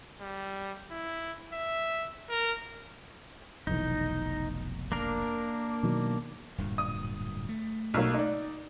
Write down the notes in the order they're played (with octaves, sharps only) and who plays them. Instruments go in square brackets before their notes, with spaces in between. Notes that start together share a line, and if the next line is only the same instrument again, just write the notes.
[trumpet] G3
E4
E5
A#4
[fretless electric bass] F1 B1 E3 [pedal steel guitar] D#4
[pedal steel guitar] A#3 D4 A#4
[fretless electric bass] B2 D#3 F#3
[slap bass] D1 G2 A#2
[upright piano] D#6
[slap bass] A3
[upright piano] B1 F#3 A#3
D#4 D5